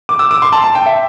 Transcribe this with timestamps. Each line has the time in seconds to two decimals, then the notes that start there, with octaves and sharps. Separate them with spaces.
0.09 D6
0.19 E6
0.31 D6
0.42 C6
0.52 A5
0.64 A5
0.75 G5
0.86 E5